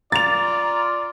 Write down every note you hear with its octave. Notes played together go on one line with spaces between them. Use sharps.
F4 D5 A#5 A6 F7